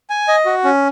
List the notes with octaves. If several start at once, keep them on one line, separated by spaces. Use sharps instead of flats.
G#5
D#5
F#4
C#4